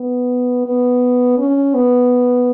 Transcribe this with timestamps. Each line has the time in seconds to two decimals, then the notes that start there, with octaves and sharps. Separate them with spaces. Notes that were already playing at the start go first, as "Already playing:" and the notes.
Already playing: B3
0.66 B3
1.38 C#4
1.74 B3